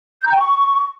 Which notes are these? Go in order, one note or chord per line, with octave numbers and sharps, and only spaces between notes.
G6
A#5
G5
C#6